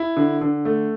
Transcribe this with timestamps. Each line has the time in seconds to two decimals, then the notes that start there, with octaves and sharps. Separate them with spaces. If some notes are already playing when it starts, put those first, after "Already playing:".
Already playing: E4
0.17 D3
0.41 D3
0.65 A3